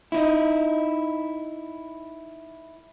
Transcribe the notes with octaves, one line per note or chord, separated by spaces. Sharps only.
D#4 E4